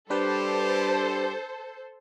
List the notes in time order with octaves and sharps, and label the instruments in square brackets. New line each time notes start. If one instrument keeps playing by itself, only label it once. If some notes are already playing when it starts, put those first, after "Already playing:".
[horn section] G3 G4 [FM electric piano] D4 B4 [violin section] A4 C5